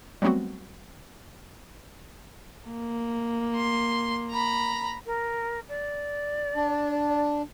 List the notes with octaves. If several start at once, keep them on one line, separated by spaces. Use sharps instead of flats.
F#3 G3 A3 B3 C4 F#4
A#3
C6
A#5 B5
A#4
D5
D4